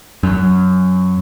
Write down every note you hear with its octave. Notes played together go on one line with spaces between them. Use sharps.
F#2